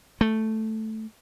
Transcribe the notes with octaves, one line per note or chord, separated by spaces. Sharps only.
A3